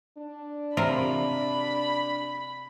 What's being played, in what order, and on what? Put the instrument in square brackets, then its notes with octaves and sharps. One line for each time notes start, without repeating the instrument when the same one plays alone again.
[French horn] D4
[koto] C3 F4 A#4 [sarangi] B5